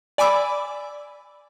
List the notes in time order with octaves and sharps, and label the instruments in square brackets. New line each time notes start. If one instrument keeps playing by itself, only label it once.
[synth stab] D5 G#5 B5 D6 E6